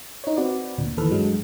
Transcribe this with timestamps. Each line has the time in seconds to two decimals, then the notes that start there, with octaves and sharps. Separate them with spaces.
0.24 D#4 C#5
0.37 C4 F#4 B4 D5
0.78 D2 A#2
0.97 D#2 E3 A4 B4 F6
1.11 G2 F#3 G#3